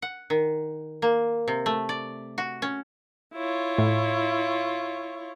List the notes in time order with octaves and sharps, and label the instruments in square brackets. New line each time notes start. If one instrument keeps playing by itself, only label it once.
[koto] F#5
D#3
A#3
C3
A3
D5
F#4
C#4
[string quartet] E4 F4 C#5
[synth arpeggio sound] A2